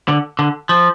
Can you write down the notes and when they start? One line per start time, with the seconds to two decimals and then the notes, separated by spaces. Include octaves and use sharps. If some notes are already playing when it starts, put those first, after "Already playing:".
0.08 D3
0.39 D3
0.69 F3